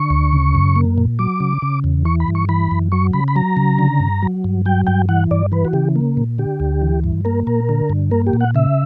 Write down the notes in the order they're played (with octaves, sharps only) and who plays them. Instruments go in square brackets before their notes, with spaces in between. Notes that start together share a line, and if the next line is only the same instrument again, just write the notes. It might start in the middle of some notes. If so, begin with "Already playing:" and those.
Already playing: [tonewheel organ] D3 C#6
D2
C#3
F#2
A#3
A#2
F#3 D6
C#3
C#3
E2
E3 C#6
B5
G2
C#6
E3 B5
F#2
F#3 C#6
C#3 B5
B5
F#3 A#5
C#3
D3
G2
F#3
G2
F#3 G5
G2 G5
E3 F#5
G2 D5
E3 B4
F#4
C#3 G4
A#3
A#2
D3 G4
D2
E3
G2
A#3 A#4
A#2 A#4
D3
G2
A#3 A#4
G4
A#2
F#5
C#3 E5